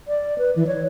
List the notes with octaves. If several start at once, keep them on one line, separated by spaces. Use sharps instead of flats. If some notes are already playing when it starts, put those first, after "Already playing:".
D5
B4
E3
C#5